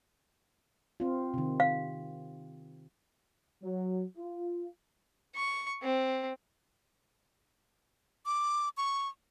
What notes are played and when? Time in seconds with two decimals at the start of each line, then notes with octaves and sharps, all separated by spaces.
1.00 C4 F4
1.34 C3 D#3
1.60 F5
3.63 F#3
4.17 F4
5.35 C#6
5.83 C4
8.26 D6
8.77 C#6